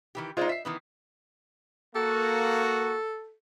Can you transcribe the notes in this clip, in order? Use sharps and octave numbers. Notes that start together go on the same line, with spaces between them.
D#3 E3 G4
G#3 D4 D#4 F4 C5 D5
E5 B6 C7
D#3 E3 B3
A#3 F#4 A4